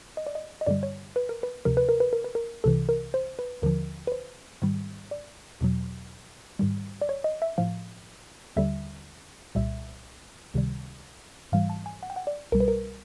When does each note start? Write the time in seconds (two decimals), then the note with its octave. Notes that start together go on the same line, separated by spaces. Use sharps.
0.17 D#5
0.27 D5
0.35 D#5
0.61 D#5
0.67 G2 D3 G3 D5
0.83 C#5
1.16 B4
1.29 A#4
1.43 B4
1.65 D2 C3 F3 A#4
1.77 B4
1.89 A#4
2.00 B4
2.13 A#4
2.24 B4
2.35 A#4
2.64 C2 C3 E3 A4
2.89 A#4
3.14 C5
3.39 B4
3.62 D#2 D3 F3 A#4
4.07 B4
4.12 C5
4.62 G#2 D#3 G3
5.11 D5
5.61 E2 B2 F#3
6.59 G#2 D#3 G3
7.01 D5
7.09 C#5
7.24 D#5
7.42 E5
7.58 A2 F3 F5
8.56 D#2 D3 G3 E5
9.55 C2 A#2 G3 E5
10.54 C#2 C3 D#3 G3
11.52 G#2 E3 G3 F5
11.70 A5
11.86 G#5
12.03 F#5
12.10 G5
12.16 F#5
12.27 D5
12.52 C2 B2 G3 A#4
12.60 B4
12.68 A#4